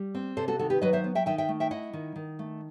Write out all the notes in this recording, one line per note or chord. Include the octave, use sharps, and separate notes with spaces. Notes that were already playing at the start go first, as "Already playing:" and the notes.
Already playing: G3
C4
C3 A4 C5
F#4 A4
D#3 F#4 A4
G4 B4
F#3 B4 D#5
C5 E5
B3
E5 G5
D#3 E5 G5
E5 G5
A3
E5 G5
E4 D#5 F#5
D#3
D#3
A3